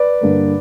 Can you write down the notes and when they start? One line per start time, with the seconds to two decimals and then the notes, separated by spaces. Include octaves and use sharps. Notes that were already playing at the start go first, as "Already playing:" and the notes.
Already playing: B4 D5
0.21 G2 D3 A#3